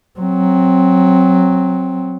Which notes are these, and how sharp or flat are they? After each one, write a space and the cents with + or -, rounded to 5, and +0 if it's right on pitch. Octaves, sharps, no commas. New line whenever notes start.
F#3 +0 C4 +10